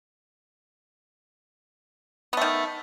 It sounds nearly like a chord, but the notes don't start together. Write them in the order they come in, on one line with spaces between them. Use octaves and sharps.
B3 A3 D#3